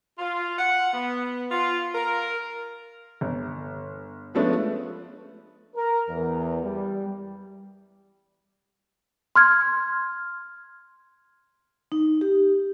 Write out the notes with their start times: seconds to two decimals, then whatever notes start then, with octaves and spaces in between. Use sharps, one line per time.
0.19 F4
0.58 F#5
0.93 B3
1.51 F4
1.95 A#4
3.21 G1
4.35 F3 G#3 A3 B3 C#4 D4
5.75 A#4
6.09 E2
6.64 G3
9.36 C6 F6 G#6
11.92 D#4
12.21 G4